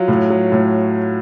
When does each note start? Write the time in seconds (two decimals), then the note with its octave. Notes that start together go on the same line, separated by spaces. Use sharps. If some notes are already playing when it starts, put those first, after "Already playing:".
Already playing: F#3 F4
0.08 A2
0.30 F#3
0.52 A2